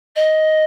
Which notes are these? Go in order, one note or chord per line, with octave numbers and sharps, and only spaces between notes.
D#5